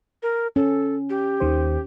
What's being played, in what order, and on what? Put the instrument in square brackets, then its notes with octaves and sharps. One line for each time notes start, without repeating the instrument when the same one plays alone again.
[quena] A#4
[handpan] C#4 [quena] A4
[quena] G4
[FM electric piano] D#2 D#3 C5